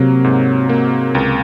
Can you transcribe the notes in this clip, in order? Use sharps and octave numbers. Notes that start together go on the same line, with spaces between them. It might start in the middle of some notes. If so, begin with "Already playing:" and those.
Already playing: C3 F#3 A#3
G#2
A#3
C#2